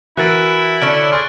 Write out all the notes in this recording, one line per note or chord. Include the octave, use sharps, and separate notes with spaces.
E3 E4 F#4 A#4 F#6 A6 D7
D3 C#4 A4 C#6 F6 D7
G#4 C6 F6 F#6 A6